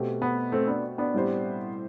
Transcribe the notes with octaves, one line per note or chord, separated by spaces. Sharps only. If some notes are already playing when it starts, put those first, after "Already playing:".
Already playing: B2 A3 C4 G4
B3
A3 C4
B3 D4
B3 D4
A2 G3 C4 G4 C5